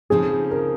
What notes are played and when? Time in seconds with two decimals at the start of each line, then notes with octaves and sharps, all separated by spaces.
0.10 C#3 F3 C4 D#4 G#4
0.51 A#4